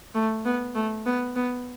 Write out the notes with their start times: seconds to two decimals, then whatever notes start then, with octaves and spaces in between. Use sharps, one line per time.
0.14 A3
0.45 B3
0.75 A3
1.06 B3
1.36 B3